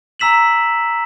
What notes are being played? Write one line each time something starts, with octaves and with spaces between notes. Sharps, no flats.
G#5 A#5 E6 B6 E7 F#7